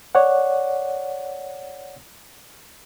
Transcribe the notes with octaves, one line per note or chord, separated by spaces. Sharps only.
C#5 D5 F#5